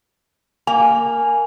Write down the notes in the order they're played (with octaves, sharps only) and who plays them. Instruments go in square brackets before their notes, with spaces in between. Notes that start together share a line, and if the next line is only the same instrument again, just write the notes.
[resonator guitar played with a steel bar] A#3 [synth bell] G#5